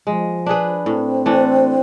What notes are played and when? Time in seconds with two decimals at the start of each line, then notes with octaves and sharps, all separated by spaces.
0.07 F3 G#3
0.46 D4 G#4 B4
0.86 A2 C4
1.26 E3 A3 D4